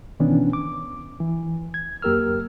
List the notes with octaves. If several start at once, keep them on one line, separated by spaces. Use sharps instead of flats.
B2 D#3 E3 B3 C#4 D4
D6
E3
G#6
F#2 A#3 G4 A#4 E6 F6